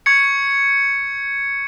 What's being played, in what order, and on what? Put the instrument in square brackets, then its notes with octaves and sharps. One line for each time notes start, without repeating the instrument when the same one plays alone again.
[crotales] C#6 G#6 C#7